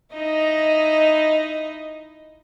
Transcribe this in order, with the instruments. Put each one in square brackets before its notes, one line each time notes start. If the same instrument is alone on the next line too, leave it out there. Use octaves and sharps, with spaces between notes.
[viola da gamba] D#4 E4 D#5